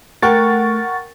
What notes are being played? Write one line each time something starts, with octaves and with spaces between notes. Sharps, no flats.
A3 A#4 F#5 G5 C#6 A6